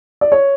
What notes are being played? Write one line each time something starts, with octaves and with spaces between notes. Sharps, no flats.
D5
C#5